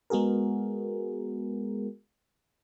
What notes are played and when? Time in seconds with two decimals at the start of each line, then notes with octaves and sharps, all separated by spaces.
0.10 G#3 B3 F#4 G#4 A#4